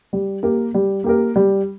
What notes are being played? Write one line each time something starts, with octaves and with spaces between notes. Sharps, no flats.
G3
A#3 G4 A#4
G3
A#3 G4 A#4
G3